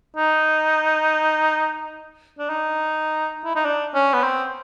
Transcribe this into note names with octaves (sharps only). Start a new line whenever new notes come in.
D#4
D4
D#4
E4
D#4
D4
C#4
B3
C4